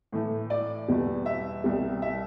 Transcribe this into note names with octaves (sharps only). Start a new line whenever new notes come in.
A2 E3 A3
D5
E2 B2 G3
E5
C2 B2 G3
E5